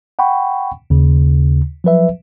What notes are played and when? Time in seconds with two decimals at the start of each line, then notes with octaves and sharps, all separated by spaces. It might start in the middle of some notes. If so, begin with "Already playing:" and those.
0.19 F#5 G5 B5 C#6
0.90 D#2 C#3
1.84 F3 F#3 B4 E5